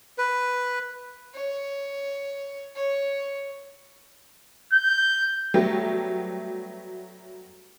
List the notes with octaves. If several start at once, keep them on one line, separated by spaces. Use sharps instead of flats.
B4
C#5
C#5
G6
F#3 G3 A3 B3 G4